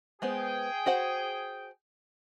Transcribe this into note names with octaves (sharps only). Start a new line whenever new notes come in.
G#3 B3 G#4 C5 G5
F#4 C5 F#5